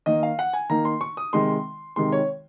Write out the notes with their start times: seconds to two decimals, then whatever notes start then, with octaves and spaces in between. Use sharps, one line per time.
0.06 D#3 A#3 D#4 D#5
0.23 F5
0.39 F#5
0.53 G#5
0.70 D#3 A#3 D#4 A#5
0.85 C6
1.01 C#6
1.17 D#6
1.33 C3 D#3 G#3 D#4 C6
1.96 C3 D#3 G#3 D#4 C6
2.12 C#5